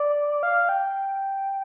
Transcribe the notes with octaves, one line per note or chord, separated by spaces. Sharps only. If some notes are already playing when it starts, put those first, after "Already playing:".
Already playing: D5
F5
G5